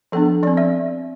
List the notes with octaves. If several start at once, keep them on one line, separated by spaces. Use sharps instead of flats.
F3 B3 D4 A4
F3 C4 D5
E5